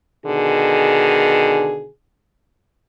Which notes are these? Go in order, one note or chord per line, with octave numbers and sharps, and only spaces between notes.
B2 D3 D#3 G#4